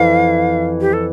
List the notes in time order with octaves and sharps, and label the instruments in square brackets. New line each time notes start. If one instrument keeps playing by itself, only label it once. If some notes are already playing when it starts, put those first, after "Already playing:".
Already playing: [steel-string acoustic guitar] F2 E3 [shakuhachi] F5
[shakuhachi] G4
A4